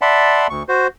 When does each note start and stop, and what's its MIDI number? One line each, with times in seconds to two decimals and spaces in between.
0.01 0.47 74
0.01 0.47 76
0.01 0.47 78
0.01 0.47 81
0.01 0.47 83
0.01 0.47 84
0.50 0.63 38
0.50 0.63 85
0.69 0.87 66
0.69 0.87 72